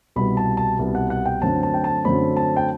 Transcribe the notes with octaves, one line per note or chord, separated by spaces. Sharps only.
C2 B2 G3 B3 B5
A5
A5
C2 B2 G3 B3
F#5
F#5
G5
F#2 D3 F#3 A3 C4 A5
A5
G5
A5
F#2 D3 F#3 A3 C4 B5
A5
G5